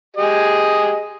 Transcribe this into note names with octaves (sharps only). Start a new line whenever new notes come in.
G4 G#4 D#5